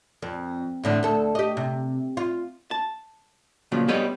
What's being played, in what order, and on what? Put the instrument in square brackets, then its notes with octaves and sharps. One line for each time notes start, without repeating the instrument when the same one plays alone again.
[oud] F2
E2 A2 D3
D2 A4
G4 D#5
C3
F4
[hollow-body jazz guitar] A5
A#2 C#3 F3 F#3
G3 G#3 B3 B4 C#5 D#5